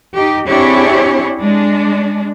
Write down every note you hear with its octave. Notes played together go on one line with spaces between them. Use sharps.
D#4 G4
C4 D4 E4 G4 G#4 C#5
G#3 D4